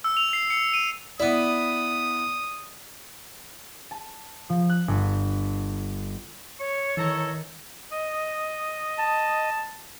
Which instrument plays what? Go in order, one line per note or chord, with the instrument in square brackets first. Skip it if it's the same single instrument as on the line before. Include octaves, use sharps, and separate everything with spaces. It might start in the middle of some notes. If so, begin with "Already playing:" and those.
[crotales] E6
F7
C7
C#7
D#7
[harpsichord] B3 E4 [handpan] D5 [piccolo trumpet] D#6
[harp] A5
F3
F#6
G1
[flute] C#5 [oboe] C#6
[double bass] D#3 [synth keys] E3 A#5 C#6 [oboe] A4
[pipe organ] D#5
[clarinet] A5